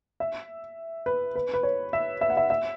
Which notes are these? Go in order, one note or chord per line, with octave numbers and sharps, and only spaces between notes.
E5
B4
B4
B4
C#5
E5
E5
F#5
E5
E5